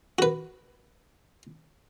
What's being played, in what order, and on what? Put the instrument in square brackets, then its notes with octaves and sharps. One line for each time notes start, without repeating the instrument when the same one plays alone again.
[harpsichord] F#4 B4